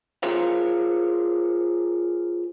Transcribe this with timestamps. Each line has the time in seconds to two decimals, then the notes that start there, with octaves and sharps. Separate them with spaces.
0.23 F4 G#4 A#4 C5 C#5 F5